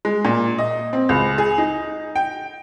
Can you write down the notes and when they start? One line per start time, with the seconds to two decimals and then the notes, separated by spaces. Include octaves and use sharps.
0.05 G#3
0.25 A#2
0.59 D#5
0.93 C4
1.09 C#2
1.38 G#4
1.58 D#4
2.16 G5